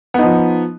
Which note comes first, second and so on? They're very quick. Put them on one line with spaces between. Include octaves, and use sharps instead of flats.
B3 D#4 F3